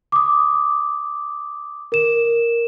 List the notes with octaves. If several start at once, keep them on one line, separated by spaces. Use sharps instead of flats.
D6 D#6
A#4 E7